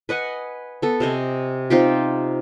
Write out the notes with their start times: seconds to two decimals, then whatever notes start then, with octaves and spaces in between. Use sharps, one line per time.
0.09 B4 D#5 F#5 G#5
0.82 B3 A4
1.00 C3 C5 D#5 G#5
1.70 C4 D#4 F4 G4